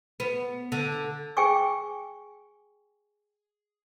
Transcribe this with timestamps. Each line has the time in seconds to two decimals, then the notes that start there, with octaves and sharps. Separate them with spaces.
0.20 B3
0.72 D3
1.37 G#4 G5 G#5 C#6 D6